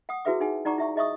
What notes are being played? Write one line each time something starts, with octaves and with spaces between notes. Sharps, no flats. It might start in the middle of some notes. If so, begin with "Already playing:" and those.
F#5 D#6
E4 F#4 G#4 B4 E5 D6
D#4 G#4 F#5 G#5
D#4 D5 F#5 A#5 C#6 D6
E4 E5 C#6
G#4 D#5 E5 C#6 D#6